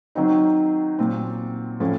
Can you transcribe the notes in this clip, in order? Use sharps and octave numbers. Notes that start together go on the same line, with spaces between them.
D#3 F#3 C4 D#4
A#2 F#3 C4
A2 F3 A3 C#4